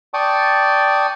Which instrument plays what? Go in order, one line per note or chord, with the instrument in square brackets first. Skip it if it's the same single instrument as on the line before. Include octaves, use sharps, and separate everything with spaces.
[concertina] D5 G5 A5 C#6 D#6